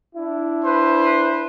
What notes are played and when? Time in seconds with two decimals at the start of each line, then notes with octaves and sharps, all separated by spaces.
0.15 D4 E4
0.64 B4 C5